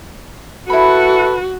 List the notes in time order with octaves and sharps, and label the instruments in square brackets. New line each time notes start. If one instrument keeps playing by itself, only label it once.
[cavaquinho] E4 B5 [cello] F#4 [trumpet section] A4 B4